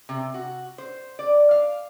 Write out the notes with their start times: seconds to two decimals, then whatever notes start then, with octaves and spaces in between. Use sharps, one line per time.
0.09 C3
0.34 F#4
0.78 C5
1.19 D5
1.51 F5